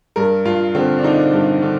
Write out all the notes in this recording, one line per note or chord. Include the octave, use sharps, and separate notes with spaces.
G2 A#4
G2 F4
D3 C4
D4
D3 D#4
G2
D3